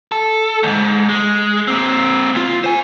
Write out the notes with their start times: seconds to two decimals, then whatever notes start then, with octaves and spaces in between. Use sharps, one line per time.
0.12 A4
0.63 D2 G#2
1.09 G#3
1.68 A#3 C4
2.35 D2 F4
2.64 C5 G#5